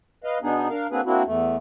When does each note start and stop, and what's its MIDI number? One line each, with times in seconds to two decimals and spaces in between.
0.24 0.38 71
0.24 0.38 75
0.24 0.38 77
0.43 0.68 47
0.43 0.68 59
0.43 0.68 62
0.43 0.68 63
0.43 0.68 68
0.70 0.87 62
0.70 0.87 70
0.70 0.87 77
0.91 1.01 58
0.91 1.01 60
0.91 1.01 62
0.91 1.01 66
0.91 1.01 68
0.91 1.01 71
1.06 1.23 58
1.06 1.23 60
1.06 1.23 62
1.06 1.23 64
1.06 1.23 66
1.25 1.56 40
1.25 1.56 57